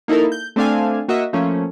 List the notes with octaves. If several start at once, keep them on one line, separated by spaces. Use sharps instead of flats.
A#3 D#4 E4 A4 A#4
G6
A3 C4 D4 A4 F5 G#5
A#3 F#4 D#5 E5
F3 A3 A#3 C#4